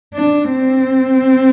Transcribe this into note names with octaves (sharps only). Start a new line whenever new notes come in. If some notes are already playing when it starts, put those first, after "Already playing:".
D4
C4